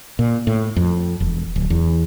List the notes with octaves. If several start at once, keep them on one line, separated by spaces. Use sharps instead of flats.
A#2
A2
F2
E1
D1
E2